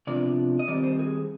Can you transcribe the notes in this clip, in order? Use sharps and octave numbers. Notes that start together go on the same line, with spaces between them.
C3 F3 B3 D4 D5
D#5
D#3 G3 C4 D5
C5
G#4